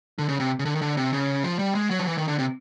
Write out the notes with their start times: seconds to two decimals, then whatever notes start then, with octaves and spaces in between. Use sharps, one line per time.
0.19 D3
0.29 C#3
0.40 C3
0.59 C#3
0.65 D3
0.75 D#3
0.81 D3
0.97 C3
1.13 C#3
1.43 F3
1.59 G3
1.75 G#3
1.90 F#3
1.99 F3
2.07 E3
2.18 D#3
2.28 D3
2.39 C3